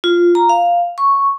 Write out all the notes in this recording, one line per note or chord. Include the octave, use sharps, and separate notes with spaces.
F4
A#5
F5
C#6